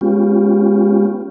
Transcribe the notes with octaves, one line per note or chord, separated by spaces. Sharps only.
G#3 B3 C#4 F4 G4